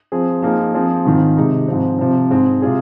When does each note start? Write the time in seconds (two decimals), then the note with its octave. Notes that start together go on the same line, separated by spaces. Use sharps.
0.12 F3 C4 G#4
0.42 F3 A#3 D#4 G#4
0.74 F3 C4 G#4
1.05 G#2 D#3 C4 F4
1.37 C3 G#3 D#4
1.68 G#2 F3 C4
1.99 C3 F3 C4
2.30 G#2 G#3 C4 G#4
2.62 C3 G#3 F4 G#4